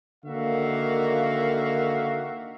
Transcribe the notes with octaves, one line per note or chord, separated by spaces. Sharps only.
D3 D#3 A#3 F#4 E5 F5